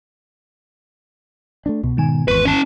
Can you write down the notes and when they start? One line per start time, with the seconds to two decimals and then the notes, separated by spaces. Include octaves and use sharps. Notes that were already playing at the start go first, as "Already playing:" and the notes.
1.66 A3 B3 D4
1.84 C2 B2
1.97 G#2 D#3 G#5
2.28 G#1 E2 B4 C6 C#6
2.45 C#4 A5